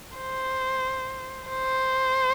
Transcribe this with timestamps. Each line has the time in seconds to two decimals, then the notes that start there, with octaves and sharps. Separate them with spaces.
0.17 C5
1.49 C5